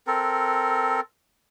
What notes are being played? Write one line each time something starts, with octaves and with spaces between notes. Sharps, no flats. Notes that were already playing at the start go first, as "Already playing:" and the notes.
C4 A4 A#4